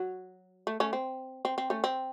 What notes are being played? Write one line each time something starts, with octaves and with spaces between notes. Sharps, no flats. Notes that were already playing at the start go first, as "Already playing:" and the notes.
Already playing: F#3
A3
A3 C#4
C4
C4
C4
A3 C#4
C4